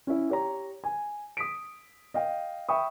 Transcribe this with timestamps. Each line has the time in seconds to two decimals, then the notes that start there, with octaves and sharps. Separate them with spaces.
0.07 C#4 E4
0.30 G4 C#5 A#5
0.84 G#5
1.37 D#6 B6 D7
2.14 D#5 F5 G5
2.68 E5 G5 B5 C#6 D#6